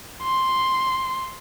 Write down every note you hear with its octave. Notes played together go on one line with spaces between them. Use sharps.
C6